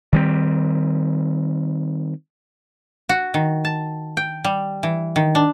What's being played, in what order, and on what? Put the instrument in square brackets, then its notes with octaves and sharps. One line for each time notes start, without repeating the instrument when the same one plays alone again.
[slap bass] D#3 G3 C4
[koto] F#4
D#3
A5
G5
G3
E3
D#3
D4